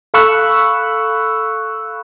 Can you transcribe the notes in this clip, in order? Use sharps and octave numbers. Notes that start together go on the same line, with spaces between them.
A4 F5 B5 C#6 E6 F#6